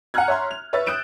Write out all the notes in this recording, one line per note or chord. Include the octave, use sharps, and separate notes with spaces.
F#5 G#5 A#5 F6 F#6 G#6
C#5 E5 A#5 C6
F7
B4 C#5 E5 E6 A6
D#6 F#6 G6 D7 E7